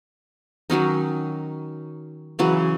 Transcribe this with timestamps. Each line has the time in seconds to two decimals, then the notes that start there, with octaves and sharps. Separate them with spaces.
0.70 D#3 F#3 C#4 D#4
2.39 C#3 E3 F#3